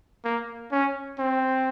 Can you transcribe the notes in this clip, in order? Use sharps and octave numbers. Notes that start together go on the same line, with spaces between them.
A#3
C#4
C4